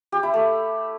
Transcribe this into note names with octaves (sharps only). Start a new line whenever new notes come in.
G4
E4
A3